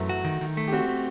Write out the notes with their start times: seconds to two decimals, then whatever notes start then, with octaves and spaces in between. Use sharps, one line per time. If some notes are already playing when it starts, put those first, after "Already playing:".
Already playing: F#2 E3 F#3 A3
0.09 F#4
0.24 D#3
0.41 D#3
0.57 A3
0.68 G4
0.73 C4 F#4
0.89 A3